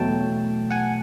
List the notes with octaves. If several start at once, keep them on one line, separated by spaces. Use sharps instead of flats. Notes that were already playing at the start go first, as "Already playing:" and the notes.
Already playing: E2 B2 F#3 A3 G5 A5
F#5 G#5